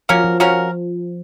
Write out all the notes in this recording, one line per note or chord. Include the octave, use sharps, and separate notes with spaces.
F3 A#3 C#4 F#4 A#4
F3
A#3 C#4 F#4 A#4